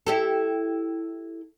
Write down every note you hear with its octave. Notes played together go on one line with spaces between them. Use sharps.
E4 G4 A4